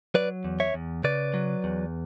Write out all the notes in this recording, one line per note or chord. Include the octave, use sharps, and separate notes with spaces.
F#3 B4 D5
E2
C#5 E5
E2
C#3 B4 D5
F#3
E2